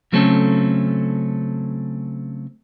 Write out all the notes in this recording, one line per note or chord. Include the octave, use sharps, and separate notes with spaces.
C#3 F#3 A3 C4 C#4 A4